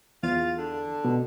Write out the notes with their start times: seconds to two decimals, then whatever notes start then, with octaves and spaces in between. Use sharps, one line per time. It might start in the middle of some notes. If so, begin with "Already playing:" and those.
0.23 E2 F4
0.58 D3
1.05 B2